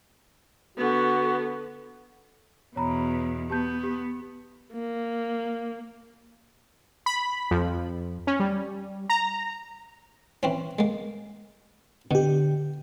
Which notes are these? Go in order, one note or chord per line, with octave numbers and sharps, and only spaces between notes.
D3 B3 F#4
E2 B2 C#5 A#5 B5
B3 G4 A5 G6
G4
A#3
B5
F2
C#4
G3
A#5
E3 C4 C#4
G#3 A#3
B2 D3 G4